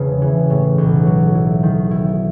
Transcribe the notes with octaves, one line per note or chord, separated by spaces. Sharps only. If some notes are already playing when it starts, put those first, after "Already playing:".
Already playing: E1 C#3
E3
A2
B1
F#3
E4
D#3
E4